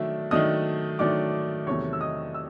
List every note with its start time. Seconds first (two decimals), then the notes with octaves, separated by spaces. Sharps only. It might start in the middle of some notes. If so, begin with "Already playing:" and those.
Already playing: D#3 F#3 A3 D4 D5 E5
0.31 D#3 F#3 A3 D4 D#5 D#6
0.99 D#3 F#3 A3 D4 D5 D6
1.67 E2 C3 D#3 F#3 A3 C#5 C#6
1.93 E6
2.01 D#5 D#6
2.34 E6